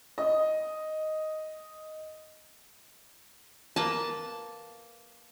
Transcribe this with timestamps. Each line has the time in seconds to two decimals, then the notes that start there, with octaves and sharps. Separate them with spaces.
0.18 D#5 D#6
3.76 A#3 B4 A5